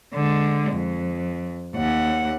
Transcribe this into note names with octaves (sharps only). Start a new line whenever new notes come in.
D3 G#3
F2
D#2 F#5